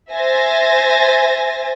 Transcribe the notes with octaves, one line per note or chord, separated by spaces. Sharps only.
C5 E5 G#5 A6 A#6